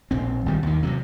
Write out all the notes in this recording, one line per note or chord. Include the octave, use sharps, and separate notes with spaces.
A#1 C4
G#1 D#3 G3
D#2 D#3
C3 F3 F#3